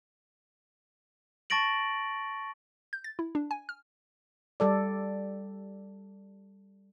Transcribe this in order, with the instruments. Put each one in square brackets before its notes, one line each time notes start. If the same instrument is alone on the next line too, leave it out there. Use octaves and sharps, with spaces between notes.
[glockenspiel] A5 C#6 A6 A#6 D7 F#7
[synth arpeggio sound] G6
A6
E4
D4
G#5
F6
[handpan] G3 A4 D5